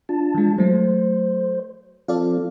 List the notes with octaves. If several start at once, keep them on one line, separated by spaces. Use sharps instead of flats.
D4 F4 A5
E3 G#3
F#3 A3 C5
F3 C4 F4 A4 D5 F5